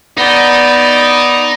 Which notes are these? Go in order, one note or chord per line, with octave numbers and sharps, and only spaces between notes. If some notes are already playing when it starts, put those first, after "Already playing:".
B3 D#4 D5